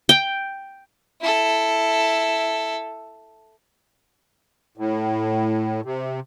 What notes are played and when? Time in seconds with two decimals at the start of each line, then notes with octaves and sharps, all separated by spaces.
0.09 G5
1.21 E4 A4
4.78 A2
5.85 C3